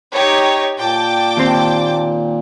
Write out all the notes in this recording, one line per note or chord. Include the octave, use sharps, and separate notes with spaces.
D#4 G4 C#5
A#2 G5 A5 D6
D#2 C4